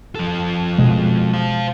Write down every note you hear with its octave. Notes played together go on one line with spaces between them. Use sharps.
F3 A4
B2 G#3
C5 F5